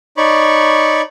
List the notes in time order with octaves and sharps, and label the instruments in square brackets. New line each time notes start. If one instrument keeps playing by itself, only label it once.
[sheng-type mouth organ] D#4 C#5 D5 B5 C#6